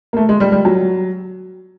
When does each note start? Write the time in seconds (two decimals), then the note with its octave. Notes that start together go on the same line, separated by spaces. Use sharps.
0.13 A#3
0.17 A3
0.29 G#3
0.40 G3
0.52 G3
0.65 F#3